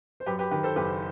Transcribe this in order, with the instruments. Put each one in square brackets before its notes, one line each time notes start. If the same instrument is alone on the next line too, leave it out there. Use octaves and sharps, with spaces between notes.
[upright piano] C5
F#2 G4 B4
G4 B4
D#3 G4 B4
A4 C5
F#1 G4 B4